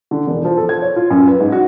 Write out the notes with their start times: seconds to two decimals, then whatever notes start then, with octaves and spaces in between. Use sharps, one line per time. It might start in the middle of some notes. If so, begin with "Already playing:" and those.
0.11 D3
0.27 E1
0.45 F3
0.57 A4
0.69 G#6
0.82 C#5
0.96 F4
1.10 F#2
1.27 B4
1.40 G#2
1.52 F#4